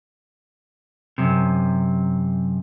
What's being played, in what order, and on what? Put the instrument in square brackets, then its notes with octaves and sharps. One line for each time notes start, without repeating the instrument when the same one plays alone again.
[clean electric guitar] F#2 C3